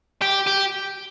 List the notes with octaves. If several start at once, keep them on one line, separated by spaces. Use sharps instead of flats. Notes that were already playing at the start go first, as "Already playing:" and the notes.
G4
G4